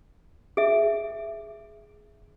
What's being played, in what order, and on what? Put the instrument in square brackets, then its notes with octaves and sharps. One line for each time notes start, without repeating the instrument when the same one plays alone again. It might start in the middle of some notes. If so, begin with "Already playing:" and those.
[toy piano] G#4 E5